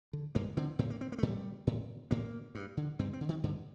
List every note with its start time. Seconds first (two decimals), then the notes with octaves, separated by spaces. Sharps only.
0.13 D3
0.35 G2 A#3
0.57 D3 C4
0.79 A2 C4
0.90 A#3
1.01 C4
1.12 A#3
1.18 A3
1.23 A2 G3
1.67 A2
2.11 A2 A#3
2.55 G2
2.77 D3
2.99 G2 C4
3.13 C4
3.21 D3
3.29 D#3
3.43 G2 D3